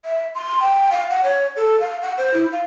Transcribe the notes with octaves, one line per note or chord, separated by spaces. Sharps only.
E5
C6
G5
F5
F#5
C#5
A4
F5
F#5
C5
E4
F5